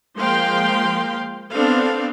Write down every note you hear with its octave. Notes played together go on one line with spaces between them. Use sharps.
F3 G#3 A#3 F5 G5 C6
B3 C4 D4 A4 F5